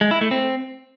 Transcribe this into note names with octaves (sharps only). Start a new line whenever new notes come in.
G#3
E4
A3
C4